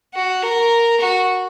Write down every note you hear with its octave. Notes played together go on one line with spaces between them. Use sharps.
F#4
A#4
F#4